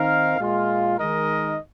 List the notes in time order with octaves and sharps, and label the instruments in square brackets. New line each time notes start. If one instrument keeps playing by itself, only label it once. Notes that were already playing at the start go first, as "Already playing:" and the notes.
Already playing: [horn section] D#3 C4 D#4 A#4 F5
A#2 G#3 F4
D#3 G#3 D#4 A#4 D#5